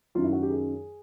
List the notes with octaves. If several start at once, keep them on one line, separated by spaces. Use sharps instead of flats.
F#2 D#3 F#3 F4
E4
F#4
G4
G#4